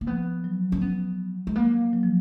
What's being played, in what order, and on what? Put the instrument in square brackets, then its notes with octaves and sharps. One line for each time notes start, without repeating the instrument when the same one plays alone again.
[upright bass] A#3
[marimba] F3 [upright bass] B3
[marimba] F#3
[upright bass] C#4
B3
G#3
A#3
[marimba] F#3
F3